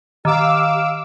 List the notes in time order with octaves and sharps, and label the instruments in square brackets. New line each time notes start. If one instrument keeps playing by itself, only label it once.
[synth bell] D#3 [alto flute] G4 [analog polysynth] F5 D6 E6